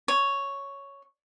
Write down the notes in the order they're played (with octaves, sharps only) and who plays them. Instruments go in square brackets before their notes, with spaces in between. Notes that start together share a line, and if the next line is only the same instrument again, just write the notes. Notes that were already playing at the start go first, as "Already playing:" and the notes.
[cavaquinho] C#5